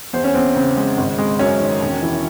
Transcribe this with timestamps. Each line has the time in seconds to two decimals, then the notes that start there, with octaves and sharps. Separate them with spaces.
0.13 E2 C5
0.24 C#4
0.34 E2 C4
0.56 C#3 C4
0.77 G#3
0.98 G#1
1.18 G#3
1.39 F#2 C#4
1.60 D#3
1.81 E1
2.03 E3